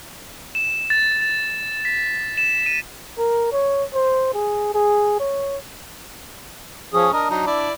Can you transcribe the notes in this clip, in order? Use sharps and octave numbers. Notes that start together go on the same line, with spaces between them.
E7
A6
A6
B6
E7
D#7
A#4
C#5
C5
G#4
G#4
C#5
F3 C#4 G#4 D#6
D4 A#4 D#5
F#3 D#4
E4 D5